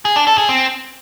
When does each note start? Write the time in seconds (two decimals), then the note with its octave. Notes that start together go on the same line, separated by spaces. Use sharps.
0.05 G#4
0.16 D4
0.27 A4
0.38 G#4
0.49 C4